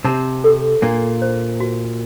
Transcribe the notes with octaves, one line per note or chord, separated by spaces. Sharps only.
C3 C4 A5
A4
A#2 A#3 D4
C5
F#4